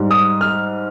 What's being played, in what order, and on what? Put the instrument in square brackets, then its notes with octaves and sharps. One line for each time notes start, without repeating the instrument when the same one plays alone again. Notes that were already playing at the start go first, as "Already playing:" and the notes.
Already playing: [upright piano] G#2 G3
D#6
F6